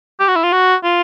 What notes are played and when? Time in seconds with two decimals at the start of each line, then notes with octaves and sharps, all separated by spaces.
0.20 G4
0.28 F#4
0.36 E4
0.44 F4
0.53 F#4
0.84 F4